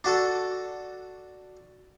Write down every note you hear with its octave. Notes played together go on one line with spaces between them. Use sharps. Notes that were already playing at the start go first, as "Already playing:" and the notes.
D4 F#4 A4